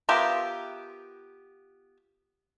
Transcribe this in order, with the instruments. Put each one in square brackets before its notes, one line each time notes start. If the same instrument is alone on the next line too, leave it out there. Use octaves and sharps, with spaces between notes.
[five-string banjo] B3 F4 G4 A#4 E5